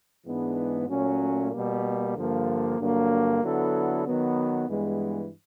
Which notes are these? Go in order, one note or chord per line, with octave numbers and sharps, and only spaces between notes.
G#2 E3 G#3 B3 D4
A#2 F#3 A3 C#4
B2 G3 A#3
G2 D3 F3 A#3
G2 D3 F#3 A#3 D4
D3 F#3 B3 E4 A4
D#3 F#3 B3
G2 E3 G#3 B3